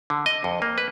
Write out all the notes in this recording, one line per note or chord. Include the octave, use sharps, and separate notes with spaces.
D3
D#5
F2
A#3
B4